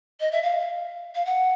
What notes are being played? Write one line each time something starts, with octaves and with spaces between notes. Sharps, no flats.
D#5
E5
F5
F5
F#5